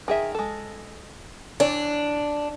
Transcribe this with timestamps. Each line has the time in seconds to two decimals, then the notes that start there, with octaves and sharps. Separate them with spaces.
0.08 D#3 G#4 E5
0.35 G#3 A4
1.60 E3 D4 C#5 D5